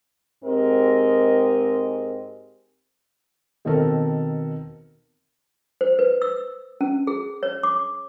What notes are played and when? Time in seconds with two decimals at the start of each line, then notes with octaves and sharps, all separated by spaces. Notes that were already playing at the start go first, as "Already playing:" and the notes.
0.44 G#2 C4 G4 G#4 A#4 D#5
3.65 B2 D#3 C4 A4 A#4
5.81 C5
5.99 B4
6.22 E6
6.81 C#4
7.07 G#4
7.43 C#5
7.63 D6